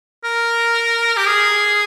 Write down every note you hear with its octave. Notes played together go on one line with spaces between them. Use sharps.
A#4
G4
G#4